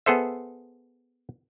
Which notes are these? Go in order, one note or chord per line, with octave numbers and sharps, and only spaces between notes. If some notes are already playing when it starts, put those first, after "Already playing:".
B3 G#4 A4 C5 E5